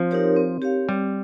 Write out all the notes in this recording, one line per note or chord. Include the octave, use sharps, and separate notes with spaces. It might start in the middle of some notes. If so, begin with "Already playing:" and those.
Already playing: F3 C4
D#4 G4 A#4 C#5
C4
G4 C#5 F5
G3 C4